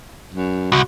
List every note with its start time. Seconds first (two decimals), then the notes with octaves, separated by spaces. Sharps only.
0.34 F#2
0.72 C2 F#4